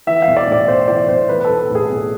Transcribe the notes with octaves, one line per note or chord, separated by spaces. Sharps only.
E3 E5
F5
B1
D5
A2 D5
B1 C5
E3 D5
B1 C5
E3 B4
B4
A4
B1
A4
A2
G#4
B1